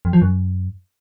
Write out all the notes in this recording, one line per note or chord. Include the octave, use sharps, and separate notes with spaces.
F2
F3
F#2